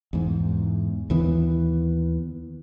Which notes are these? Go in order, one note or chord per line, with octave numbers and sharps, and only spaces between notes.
E2 G#2
D#2 E3 B3